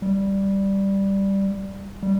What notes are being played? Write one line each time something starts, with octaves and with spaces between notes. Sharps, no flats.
G3
G3